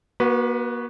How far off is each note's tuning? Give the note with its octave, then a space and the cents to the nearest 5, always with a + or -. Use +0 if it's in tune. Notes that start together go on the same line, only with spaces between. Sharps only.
A#3 +40 F#4 +0 B4 +0